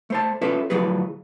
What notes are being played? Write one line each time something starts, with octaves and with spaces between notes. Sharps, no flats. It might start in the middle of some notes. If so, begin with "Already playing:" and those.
A3 C5 A5
C#4 F4 A4 B4 E5
D2 A2 F3 F#3 G#4 B4